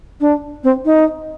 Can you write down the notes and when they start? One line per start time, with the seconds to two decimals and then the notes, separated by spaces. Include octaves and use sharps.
0.21 D4
0.64 C4
0.85 D#4